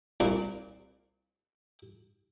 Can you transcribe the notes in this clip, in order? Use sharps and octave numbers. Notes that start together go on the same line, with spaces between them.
C2 A#2